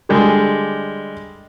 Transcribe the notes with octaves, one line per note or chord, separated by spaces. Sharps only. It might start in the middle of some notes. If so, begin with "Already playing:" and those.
D3 G3 G#3